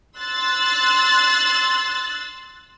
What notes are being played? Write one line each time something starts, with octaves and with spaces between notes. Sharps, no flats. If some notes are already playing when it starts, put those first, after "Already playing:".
C6 E6 F#6 A6